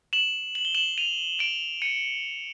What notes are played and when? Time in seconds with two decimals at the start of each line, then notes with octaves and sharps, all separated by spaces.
0.13 E7 F#7
0.55 F#7
0.65 G7
0.75 E7 F#7
0.98 D#7 F7
1.39 D7 E7
1.82 C#7 D#7